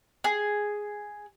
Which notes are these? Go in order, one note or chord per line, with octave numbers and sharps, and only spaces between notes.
G#4